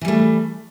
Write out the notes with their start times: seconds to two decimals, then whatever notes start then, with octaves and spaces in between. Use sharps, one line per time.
0.01 E3
0.05 G3
0.08 A3